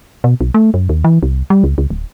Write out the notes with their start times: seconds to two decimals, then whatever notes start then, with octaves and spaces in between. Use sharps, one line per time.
0.24 B2
0.41 B1
0.54 A3
0.74 F#2
0.89 D#2
1.04 E3
1.23 C2
1.50 G3
1.64 C#2
1.78 C#2
1.90 D1